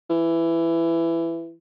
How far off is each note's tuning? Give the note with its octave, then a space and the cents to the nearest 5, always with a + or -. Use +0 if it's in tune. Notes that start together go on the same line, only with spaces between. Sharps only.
E3 +15